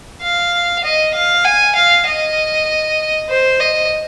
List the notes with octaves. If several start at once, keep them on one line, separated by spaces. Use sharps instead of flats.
F5
D#5
F5
G#5
F5
D#5
C5
D#5